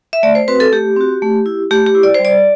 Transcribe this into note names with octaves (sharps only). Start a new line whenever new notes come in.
E5
A3 D5
C5
C4 F#4 B4
A4
A3 G4
C4 F#4
A3
E4
A3 G4
G4
E4
D5
G3 C5
D5